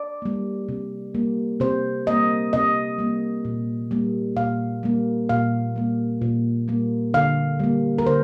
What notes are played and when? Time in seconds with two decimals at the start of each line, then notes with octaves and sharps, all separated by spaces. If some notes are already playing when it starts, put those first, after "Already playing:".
Already playing: D5
0.22 G3 A#3
0.68 C3
1.14 G3 A#3
1.60 C3 C5
2.07 G3 A#3 D#5
2.53 C3 D#5
2.98 G3 A#3
3.45 A#2
3.91 G3 A#3
4.37 A#2 F5
4.83 G3 A#3
5.29 A#2 F5
5.76 G3 A#3
6.22 A#2
6.68 G3 A#3
7.14 D3 F5
7.59 G3 A#3
7.98 A#4
8.06 D3 C5